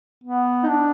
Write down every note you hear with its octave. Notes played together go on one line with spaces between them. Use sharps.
B3
D#4
D4